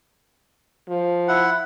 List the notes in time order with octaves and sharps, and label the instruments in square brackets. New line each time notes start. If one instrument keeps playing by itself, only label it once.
[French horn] F3
[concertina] E4 F#5